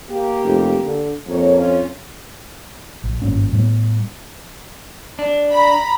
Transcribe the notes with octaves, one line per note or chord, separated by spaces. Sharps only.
A#3 G4
F1
D3
F2 A#3 C#5
C#4 F4
A#1
G#1 G2 A#2 C#4
A2 G3 B3
D4
A#5 B5